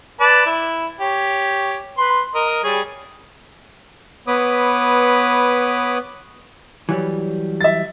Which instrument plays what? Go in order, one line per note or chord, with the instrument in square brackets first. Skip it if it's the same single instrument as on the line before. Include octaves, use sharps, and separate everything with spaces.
[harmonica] B4 D5 A5
E4
G4 C#5
B4 C6
A#4 D#5
G3 G#4 C#5
[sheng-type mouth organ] B3 B4 C#5 B5 D6 D#6
[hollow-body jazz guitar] E3 F#3 G3
[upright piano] E5 A6